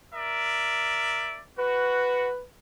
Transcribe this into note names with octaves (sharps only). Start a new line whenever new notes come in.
A#4 D5 E5
F#4 B4